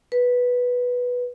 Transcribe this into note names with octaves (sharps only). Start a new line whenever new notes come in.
B4